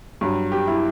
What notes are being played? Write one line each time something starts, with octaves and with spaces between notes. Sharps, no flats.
G2 F#3
G4
E4